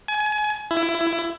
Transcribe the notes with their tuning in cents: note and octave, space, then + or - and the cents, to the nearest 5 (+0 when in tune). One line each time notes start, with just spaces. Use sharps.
G#5 +30
E4 +20